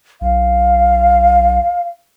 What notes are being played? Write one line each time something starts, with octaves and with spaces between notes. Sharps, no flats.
B1 F5